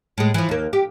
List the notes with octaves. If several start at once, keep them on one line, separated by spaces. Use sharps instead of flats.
A2 G#3
E3 F3
D#2 A#3
G4